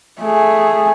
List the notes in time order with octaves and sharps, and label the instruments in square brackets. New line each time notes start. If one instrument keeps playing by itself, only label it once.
[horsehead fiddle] A3 G#4